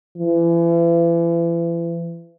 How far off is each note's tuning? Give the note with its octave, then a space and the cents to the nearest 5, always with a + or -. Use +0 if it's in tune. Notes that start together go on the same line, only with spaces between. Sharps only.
E3 +40